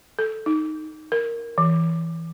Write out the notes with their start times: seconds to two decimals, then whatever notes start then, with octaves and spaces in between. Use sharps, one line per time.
0.19 A4
0.46 D#4
1.12 A#4
1.58 E3